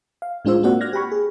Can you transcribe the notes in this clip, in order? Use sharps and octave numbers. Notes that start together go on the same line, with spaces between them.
F5
A2 G#3 D4 F4 C5 E6
A#3 C4 F#4 C5 D5 F#5
D5 F6 F#6 G#6 A#6
G4 G5 B5 C#6
G#4